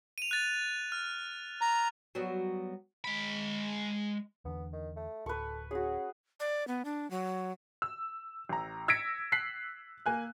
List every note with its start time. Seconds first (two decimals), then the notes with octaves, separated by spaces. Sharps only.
0.18 D#7 F7
0.31 F#6 A6
0.92 F6
1.61 A#5
2.15 F#3 G3 B3
3.04 G#3 B5
4.45 E2 D3 B3
4.73 D#3
4.96 A3
5.26 D1 A4 B4 C#6
5.71 C#4 F#4 G#4
6.40 D5
6.67 B3
6.85 D4
7.11 F#3
7.82 E6
8.49 A1 A#5
8.88 E6 G#6 A#6 B6 C#7 D7
9.32 F#6 B6 C7 F#7
10.06 A#3 G#5 F#6